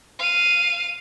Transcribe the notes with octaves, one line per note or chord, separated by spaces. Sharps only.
F5 D#7